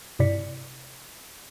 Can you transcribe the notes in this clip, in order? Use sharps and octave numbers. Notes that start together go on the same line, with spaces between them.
G2 C3 E4 D5 B6 C#7